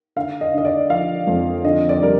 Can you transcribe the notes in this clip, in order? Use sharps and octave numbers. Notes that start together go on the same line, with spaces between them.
D3 F5
D#5
D3 D#5
D5
F3 F5
F2
D3 D#5
D5
G3 A#4